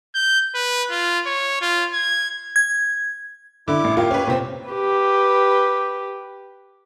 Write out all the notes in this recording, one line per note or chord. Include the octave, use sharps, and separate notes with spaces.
G6
B4
F4
C#5
F4
G#6
G#6
D3 E4 D6
A1
A#3 F4 G4
C#4 B4
A#2 C4
G4 B4